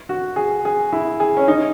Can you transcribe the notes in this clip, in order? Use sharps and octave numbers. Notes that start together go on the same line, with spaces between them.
F#4
G#4
G#4
E4
G#4
C#4
D#4